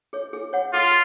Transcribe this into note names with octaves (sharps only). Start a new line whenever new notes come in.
G#4 C#5
G#4
C#5 F#5
F4 G#4